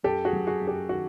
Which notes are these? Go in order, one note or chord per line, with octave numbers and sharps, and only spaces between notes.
F#2 G4 A4
F#4 G#4
F#3
F#4 G#4
F#2
G4
D#3 F#4